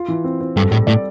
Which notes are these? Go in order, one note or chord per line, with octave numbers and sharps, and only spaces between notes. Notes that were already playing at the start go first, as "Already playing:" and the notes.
Already playing: F4
E3
C4
C4
G2 A4
A2 G3
A2 D5